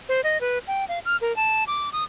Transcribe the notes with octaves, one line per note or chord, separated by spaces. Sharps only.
C5
D#5
B4
G5
F5
F6
A#4
A5
D6
D#6